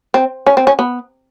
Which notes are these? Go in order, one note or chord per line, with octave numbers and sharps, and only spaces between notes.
C4
C#4
C4
C#4
B3